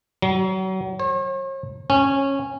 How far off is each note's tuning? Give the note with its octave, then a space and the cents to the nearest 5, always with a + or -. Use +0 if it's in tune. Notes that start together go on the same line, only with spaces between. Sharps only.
F#3 +35
C#5 -45
C#4 -15